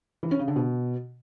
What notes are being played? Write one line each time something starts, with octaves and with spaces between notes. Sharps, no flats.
E3
C#4
C#3
D3
B2